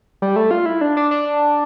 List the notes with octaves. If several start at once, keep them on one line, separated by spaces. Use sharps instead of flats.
G3
A3
F4
E4
D4
D4
D4